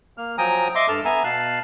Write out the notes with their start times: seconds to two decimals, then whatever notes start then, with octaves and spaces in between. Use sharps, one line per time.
0.18 A#3 F6
0.38 F3 F#3 G5 G#5 A#5 D#6
0.75 D#5 E5 C6 D6
0.89 G2 A4 A5 F6
1.05 B3 E5 G#5 A#5
1.24 B2 F5 A5 F#6